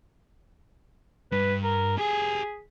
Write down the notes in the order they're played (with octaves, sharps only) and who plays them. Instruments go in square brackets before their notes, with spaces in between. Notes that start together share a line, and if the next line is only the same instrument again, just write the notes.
[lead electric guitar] G2 [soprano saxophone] B4
[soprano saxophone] A#4
[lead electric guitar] G4 G#5 [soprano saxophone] G#4